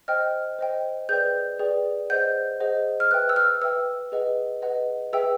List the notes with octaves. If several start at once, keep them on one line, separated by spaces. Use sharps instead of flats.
C5 D#5 G5 F6
C5 D#5 G5
G#4 B4 D5 G5 G6
G#4 B4 D5 G5
G#4 C5 D#5 F#5 G6
G#4 C5 D#5 F#5
F6
B4 E5 G5 F#6
E6
F6
B4 E5 G5 E6
G#4 B4 D#5 F#5
G#4 B4 D#5 F#5
G#4 B4 E5 G5 E6